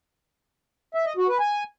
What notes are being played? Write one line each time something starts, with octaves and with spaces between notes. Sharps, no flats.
E5
D#5
F#4
B4
G#5